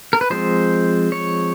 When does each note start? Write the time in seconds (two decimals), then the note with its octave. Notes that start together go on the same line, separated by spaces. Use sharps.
0.13 A#4
0.21 B4
0.30 F3 G#3 C4 C5
1.12 C#5